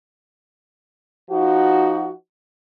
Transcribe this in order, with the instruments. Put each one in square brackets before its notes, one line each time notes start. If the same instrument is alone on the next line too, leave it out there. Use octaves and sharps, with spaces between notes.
[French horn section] F3 D#4 F#4